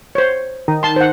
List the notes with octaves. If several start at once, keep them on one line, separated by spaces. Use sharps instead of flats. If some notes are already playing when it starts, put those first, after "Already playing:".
C5 C#5
D#3
A5 C6
C5 F#5